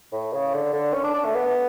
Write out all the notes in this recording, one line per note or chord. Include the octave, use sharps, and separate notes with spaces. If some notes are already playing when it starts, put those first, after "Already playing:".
A2
C#3
D3
D3
C#4
D4
D4
A3
B3